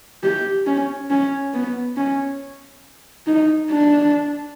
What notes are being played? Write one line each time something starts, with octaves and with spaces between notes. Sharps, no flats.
G4
C#4
C#4
B3
C#4
D#4
D4